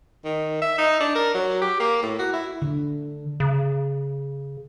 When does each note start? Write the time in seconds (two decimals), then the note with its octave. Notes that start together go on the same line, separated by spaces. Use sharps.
0.25 D#3
0.62 E5
0.78 D#4
1.00 D4
1.16 A#4
1.35 F#3
1.62 G4
1.80 A#3
2.03 A2
2.19 F#4
2.33 E4
2.62 D3
3.40 C#3